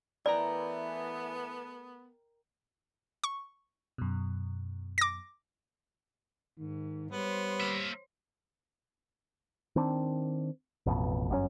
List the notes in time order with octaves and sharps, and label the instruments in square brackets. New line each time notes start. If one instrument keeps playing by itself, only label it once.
[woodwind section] E3 [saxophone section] A3 B3 [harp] A#4 G5 A#5 [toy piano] D5
[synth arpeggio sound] C#6
[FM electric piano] F#2 B2
[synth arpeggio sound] D6 A#6
[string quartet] G#2 [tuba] D#3
[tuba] G3 [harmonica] B3 [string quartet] C5 C#5
[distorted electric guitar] A#3 E5
[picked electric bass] D#3 C4 D4
A1 F2 B2
G1 F#2 C3 C#4